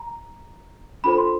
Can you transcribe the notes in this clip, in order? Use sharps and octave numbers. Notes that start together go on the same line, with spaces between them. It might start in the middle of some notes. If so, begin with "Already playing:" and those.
Already playing: A#5
D4 F4 A4 C5 B5
C6